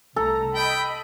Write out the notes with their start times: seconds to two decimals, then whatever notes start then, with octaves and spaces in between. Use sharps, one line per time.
0.16 C2 A3 A4 A#5
0.55 D#5 G5 B5